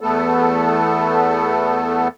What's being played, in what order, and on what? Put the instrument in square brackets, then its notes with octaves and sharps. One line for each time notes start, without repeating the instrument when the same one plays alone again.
[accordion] E2 A3 B3 A4